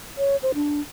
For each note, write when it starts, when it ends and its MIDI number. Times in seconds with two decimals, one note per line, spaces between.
0.18 0.37 73
0.43 0.52 72
0.55 0.80 62